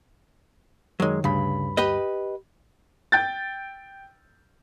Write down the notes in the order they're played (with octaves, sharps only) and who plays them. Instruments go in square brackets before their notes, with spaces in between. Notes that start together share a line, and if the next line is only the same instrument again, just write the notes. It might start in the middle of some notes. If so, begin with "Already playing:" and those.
[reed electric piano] F#2 D#3 [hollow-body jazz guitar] F#3 G#3
[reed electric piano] D2 G2 B5 [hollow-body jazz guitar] C#3
[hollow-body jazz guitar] G4 B4 D#5
[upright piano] G5 G6 A6